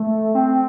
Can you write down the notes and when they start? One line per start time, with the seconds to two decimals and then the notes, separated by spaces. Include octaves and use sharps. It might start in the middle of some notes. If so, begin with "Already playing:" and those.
Already playing: A3
0.35 C4